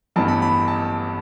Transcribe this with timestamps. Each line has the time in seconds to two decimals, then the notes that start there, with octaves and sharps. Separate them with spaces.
0.16 A1 G2 E3 B3 A5
0.28 B5
0.42 B5
0.68 A5